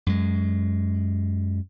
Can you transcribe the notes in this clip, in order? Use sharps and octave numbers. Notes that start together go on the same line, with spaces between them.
F#2 G#3